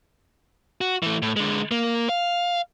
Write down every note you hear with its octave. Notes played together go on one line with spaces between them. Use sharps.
F#4
E3 A3
A2
D3 G#3
A#3
F5